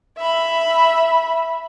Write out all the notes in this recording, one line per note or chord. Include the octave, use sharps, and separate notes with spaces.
E5 B5